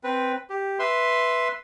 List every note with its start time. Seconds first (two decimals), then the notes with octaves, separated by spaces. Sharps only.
0.04 C4 B4
0.50 G4
0.79 B4 E5 C6